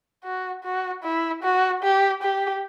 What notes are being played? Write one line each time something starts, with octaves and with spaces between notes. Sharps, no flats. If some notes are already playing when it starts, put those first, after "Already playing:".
F#4
F#4
E4
F#4
G4
G4